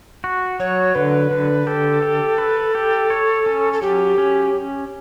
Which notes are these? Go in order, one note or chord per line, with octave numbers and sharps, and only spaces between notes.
F#4
F#3 C#5
D3 B4
D3
G4 A4
G4
B4
G4
C#5
C#4
A4
F#3 G4
C#4